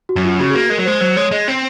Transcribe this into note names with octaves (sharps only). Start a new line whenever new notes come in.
F#4
F#2
F4
C#3 F#4
G#4
A#3 F#4
G#3 A#4
F#3
G#3 C5
F#3 C5
G#3 C#5
G#3 D#5
C4